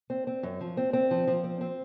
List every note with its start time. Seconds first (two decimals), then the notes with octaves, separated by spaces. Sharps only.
0.10 C4
0.27 C4
0.43 F#2
0.61 F3
0.77 C4
0.93 C4
1.11 F3
1.27 F3
1.44 C4
1.61 C4